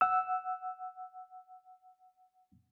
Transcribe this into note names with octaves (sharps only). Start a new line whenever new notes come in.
F#5 E6